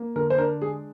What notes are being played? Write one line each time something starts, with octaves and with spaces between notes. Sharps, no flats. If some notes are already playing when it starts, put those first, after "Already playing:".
Already playing: A#3
D3 A#4
C5
D4 A#4
G#3 G#4